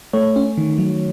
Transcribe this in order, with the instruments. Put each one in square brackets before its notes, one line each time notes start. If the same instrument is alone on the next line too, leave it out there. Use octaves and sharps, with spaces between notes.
[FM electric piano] A3 C#5
C#4
D#3
F#3